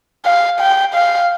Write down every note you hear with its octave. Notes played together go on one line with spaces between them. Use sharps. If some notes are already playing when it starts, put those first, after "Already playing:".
F5
G5
F5